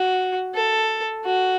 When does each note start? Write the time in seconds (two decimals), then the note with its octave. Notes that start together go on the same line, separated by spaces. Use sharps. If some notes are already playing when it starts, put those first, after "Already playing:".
Already playing: F#4
0.54 A4
1.25 F#4